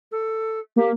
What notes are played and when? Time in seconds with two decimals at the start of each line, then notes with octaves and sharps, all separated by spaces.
0.11 A4
0.76 A#3 G4